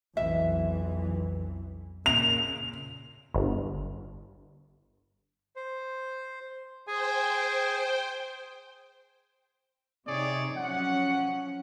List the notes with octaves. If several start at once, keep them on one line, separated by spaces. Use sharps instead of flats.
B1 F2 E3 E5
A#2 C#3 F7
G1
C5
G#4 C5 G5 G#5
C3 D#4 G#4 C#5 D5
F3 F#3 C#4 F#5